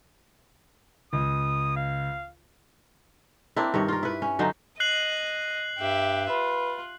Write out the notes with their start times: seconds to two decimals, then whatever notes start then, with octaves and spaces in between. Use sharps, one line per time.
1.13 C#2 D#6
1.76 F5
3.56 A#3 C4 D4 E4
3.74 G2 D#3 C#5
3.88 F4 A#4
4.03 E4 B4
4.22 C#4
4.39 D3 F#3 D#4 C5
4.80 D#5 F#6 C7 F#7
5.78 G2 G4 E5
6.29 F4 B4